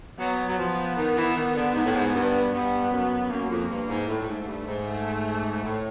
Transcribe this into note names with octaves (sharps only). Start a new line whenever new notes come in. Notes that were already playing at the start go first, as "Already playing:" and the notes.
F#3 B3
F#3
F3
D#3
E3
D#3
D3
G#2
A2
G#2
G2
G2 B3
F#2
F#2 A#3
F2
G2
G#2
A2 A3
A2
G#2
G2
G#2
A3
A2